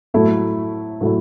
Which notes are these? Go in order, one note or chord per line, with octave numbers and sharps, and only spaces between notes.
A2 F#3 A3 E4
A2 F#3 A3 E4